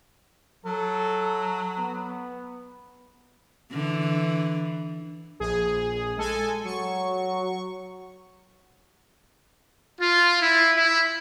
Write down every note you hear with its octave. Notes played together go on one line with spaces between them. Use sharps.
F#3 A4
B3
D3 E3
A#1 G#4
G#3 A4 G#5
F#3 C#6
F4
E4
E4